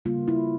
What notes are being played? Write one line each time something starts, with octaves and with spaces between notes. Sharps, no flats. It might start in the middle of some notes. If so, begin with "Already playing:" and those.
C#3 G3 A#3 F4
E4